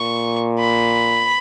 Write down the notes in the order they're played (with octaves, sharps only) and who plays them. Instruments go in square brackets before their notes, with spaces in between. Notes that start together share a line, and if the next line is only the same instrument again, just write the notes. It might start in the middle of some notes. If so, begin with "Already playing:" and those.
Already playing: [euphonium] A#2 [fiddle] C#6
[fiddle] B5